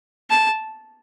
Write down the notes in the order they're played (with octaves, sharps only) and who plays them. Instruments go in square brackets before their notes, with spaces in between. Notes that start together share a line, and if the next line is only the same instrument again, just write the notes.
[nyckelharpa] A5